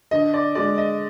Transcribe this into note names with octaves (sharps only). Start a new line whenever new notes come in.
D3 D#5
D5
G#3 D5
D#5